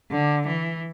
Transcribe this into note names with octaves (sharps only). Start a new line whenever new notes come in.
D3
E3